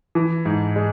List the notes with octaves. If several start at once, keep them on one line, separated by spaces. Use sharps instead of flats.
E3
G#2
G#3